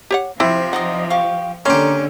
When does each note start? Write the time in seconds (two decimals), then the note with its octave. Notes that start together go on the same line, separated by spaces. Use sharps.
0.11 G4 C#5 F#5
0.40 C3 F3 E4
0.73 D#4 D5 D#5 F#5
1.10 G4 F5 C#6
1.66 D3 A#3 C#4 G4 A#5 C6 D6